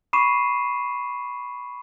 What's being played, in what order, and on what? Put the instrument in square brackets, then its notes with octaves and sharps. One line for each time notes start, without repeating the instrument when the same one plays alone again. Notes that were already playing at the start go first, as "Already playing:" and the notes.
[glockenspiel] B5 C#6 D6 C7 D#7 E7